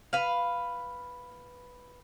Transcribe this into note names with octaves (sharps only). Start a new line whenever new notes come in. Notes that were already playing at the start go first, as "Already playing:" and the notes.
B4 F5